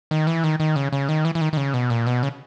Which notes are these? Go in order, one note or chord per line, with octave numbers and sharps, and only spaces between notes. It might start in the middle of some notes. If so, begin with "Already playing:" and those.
D#3
E3
D#3
D#3
C#3
C#3
D#3
E3
E3
D#3
D#3
C#3
B2
A#2
B2
C#3